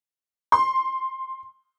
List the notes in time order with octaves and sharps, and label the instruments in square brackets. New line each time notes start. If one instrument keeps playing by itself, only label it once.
[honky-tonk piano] C6